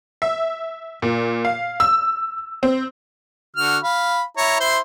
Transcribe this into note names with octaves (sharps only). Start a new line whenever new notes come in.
E5
A#2
F5
E6
C4
D3 F#4 F6
F5 B5
E4 C#5 A#5
E4 C5 C6